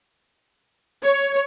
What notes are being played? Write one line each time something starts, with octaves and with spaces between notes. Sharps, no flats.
C#5